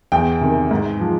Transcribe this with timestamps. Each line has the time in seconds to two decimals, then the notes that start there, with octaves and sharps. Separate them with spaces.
0.12 E2 G5
0.41 C3 D#3
0.71 G#2
1.00 F3